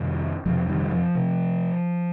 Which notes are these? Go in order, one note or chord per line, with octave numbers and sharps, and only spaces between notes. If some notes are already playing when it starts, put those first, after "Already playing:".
Already playing: F2 C3 D#3 G3
F2 C3 F3 G#3
D#3 G3
D#3
F3
C3